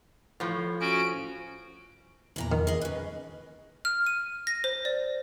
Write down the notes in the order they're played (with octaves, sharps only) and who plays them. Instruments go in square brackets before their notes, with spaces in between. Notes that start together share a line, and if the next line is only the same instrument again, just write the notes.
[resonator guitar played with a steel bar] A2 F3
[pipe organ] C#4 F#4 [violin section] D7
[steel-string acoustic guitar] E2 A#2 A#5
[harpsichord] D#3
[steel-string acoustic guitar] G#4 D#5
C#4 B4
[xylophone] F6
D#7
A#6
C5
D5